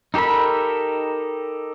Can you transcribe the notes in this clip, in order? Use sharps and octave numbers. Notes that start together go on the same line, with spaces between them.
D#4 G4 A4 A#4 B5